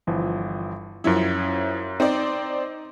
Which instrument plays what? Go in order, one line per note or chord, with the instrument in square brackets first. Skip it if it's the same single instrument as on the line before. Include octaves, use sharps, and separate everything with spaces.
[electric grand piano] G1 E3 F3
[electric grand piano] F#2 F#3 [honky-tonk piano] F3 C#4 E4
[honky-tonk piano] C4 D5 [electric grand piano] D#4